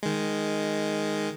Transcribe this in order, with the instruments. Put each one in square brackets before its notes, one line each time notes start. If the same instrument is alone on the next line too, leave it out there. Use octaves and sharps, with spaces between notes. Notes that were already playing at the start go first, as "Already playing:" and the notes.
[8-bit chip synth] D#3 G#3